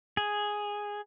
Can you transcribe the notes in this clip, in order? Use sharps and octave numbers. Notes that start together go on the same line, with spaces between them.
G#4